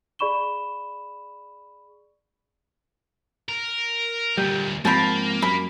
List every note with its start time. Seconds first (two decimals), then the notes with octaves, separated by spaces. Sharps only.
0.19 G#4 D5 B5 C#6 E7 G7
3.49 A#4
4.38 D2 A#2 G3
4.85 G#2 F3 A#3 C4 A5 B5
5.42 F#2 B5